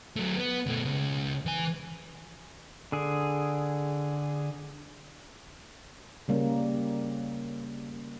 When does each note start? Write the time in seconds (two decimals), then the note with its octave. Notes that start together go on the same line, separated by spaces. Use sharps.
0.16 F#3 A3
0.36 B3
0.67 B2 A3
0.85 C#2 C#3
1.46 E3 G#5
2.92 D3 G#4
6.28 C#3 G3 A#3 C#4